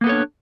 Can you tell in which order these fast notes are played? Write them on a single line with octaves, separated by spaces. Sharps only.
A#3 B3 A4 C#5 D4